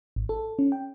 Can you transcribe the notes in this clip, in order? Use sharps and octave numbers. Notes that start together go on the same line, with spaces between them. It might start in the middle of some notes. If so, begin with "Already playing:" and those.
G#1
A4
C#4
G5